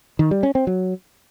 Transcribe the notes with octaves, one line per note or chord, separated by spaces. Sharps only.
D#3
G3
C#4
C4
F#3